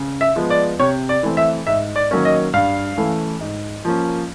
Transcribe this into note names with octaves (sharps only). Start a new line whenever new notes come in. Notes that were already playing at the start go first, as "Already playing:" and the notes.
Already playing: C#3
E5
F3 G#3 B3
D5
C3 C#5
D5
E3 A3 C4
E5
G#2 E5
D5
D#3 F#3 A#3 C#4
D#5
G2 F5
E3 A3 C#4
G#2
F3 A#3 C#4